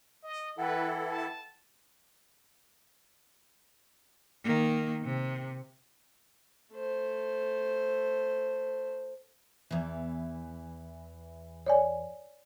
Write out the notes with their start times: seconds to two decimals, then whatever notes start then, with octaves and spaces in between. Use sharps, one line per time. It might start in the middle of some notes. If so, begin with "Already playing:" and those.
0.23 D#5
0.58 E3 E4 A4 B4 F#5 G5
1.07 A5
4.44 D#3 A#3
5.03 C3
6.73 A3 C5
9.71 E2 E3
11.66 C#5 D5 G#5